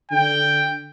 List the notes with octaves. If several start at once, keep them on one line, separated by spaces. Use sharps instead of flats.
D3 G5